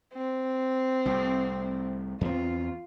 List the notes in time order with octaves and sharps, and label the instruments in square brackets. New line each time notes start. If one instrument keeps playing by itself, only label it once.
[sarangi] C4
[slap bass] C2 A2
[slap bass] E2 C4 [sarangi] F4